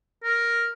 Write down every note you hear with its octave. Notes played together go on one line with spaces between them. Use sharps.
A#4